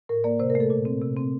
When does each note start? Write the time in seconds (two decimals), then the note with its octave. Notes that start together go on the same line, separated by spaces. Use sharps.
0.09 A2 A#4
0.24 A#3 D5
0.39 C3 C5
0.50 A#4
0.55 A3
0.60 A4
0.70 A#2
0.85 C4
1.02 C3
1.16 C4